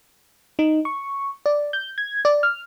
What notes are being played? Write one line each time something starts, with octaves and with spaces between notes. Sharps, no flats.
D#4
C#6
D5
G6
G#6
D5
F6